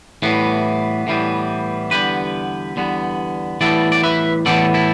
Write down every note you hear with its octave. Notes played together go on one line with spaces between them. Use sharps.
A2 E3 G3 B3
A2 E3 G3 B3
E2 D3 G3 B3 G4 B4
E2 D3 G3 B3
A2 E3 G3 B3 A4 D5
D5
B4 E5
A2 E3 G3 B3 A4 D5
E4 A4